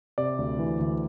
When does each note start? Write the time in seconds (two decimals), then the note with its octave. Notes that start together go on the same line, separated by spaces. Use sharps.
0.18 C3 D5
0.39 D2
0.59 E3
0.79 D2